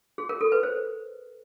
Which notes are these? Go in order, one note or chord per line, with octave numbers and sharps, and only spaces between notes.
G#4
A#4
A4
B4
C5